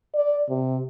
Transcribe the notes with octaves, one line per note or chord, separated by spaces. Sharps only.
D5
C3